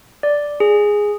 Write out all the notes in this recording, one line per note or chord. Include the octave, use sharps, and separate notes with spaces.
D5
G#4